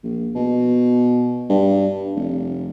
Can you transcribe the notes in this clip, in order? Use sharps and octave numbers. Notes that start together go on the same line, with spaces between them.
A#1
B2
G2
F1